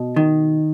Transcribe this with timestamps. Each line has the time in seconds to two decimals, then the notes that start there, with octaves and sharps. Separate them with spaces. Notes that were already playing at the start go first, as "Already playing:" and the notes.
Already playing: B2
0.16 D#3